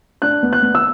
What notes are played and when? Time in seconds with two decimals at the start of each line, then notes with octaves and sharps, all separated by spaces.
0.22 D4 F#6
0.43 B3
0.53 F#6
0.62 B3
0.75 E6